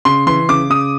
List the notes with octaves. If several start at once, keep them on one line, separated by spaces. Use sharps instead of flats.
C#3 C6
E3 C6
C#3 D6
C#3 D#6